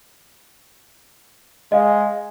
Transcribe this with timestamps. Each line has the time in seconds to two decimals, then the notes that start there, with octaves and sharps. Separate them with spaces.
1.72 G#3 D#5 F5